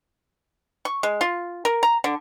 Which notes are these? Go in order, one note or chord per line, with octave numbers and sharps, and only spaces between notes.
C#6
G#3
F4
A#4
A#5
D3